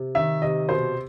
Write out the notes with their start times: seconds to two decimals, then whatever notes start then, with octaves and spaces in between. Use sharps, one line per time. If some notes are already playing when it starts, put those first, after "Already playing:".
Already playing: C3
0.15 D#3 E5
0.42 C3 D#5
0.69 B2 C5